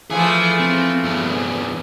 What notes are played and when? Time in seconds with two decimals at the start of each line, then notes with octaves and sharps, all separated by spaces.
0.10 E3 F3 A3 G#4 G#5
0.60 C4
1.05 E2 G2